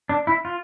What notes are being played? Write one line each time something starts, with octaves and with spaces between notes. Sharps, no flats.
D4
E4
F4